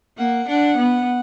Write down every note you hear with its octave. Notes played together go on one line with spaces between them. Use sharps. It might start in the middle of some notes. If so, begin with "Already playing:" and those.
A#3 F#5
D4 F#5
B3